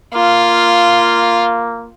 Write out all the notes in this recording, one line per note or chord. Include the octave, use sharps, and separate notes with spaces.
A#3 F4